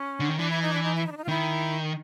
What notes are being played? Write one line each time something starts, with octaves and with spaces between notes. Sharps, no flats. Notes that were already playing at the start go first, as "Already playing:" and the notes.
Already playing: C#4
D3
D#3
E3 D4
E4
D#4
D4
D#4
E4
D#4
D4
D#4
F4
D#3 E4